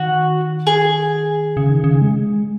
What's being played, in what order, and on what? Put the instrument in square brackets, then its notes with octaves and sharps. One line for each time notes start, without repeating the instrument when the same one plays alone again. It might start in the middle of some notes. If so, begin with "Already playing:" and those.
Already playing: [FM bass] D#3 [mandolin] F#4
[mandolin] G#4
[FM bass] C#3
D#3
C#3
G#3